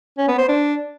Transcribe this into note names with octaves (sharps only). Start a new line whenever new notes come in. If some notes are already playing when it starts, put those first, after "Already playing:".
C#4
B3
C5
D4